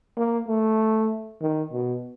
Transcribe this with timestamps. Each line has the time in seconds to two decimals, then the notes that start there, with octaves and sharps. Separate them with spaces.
0.17 A#3
0.48 A3
1.41 D#3
1.72 B2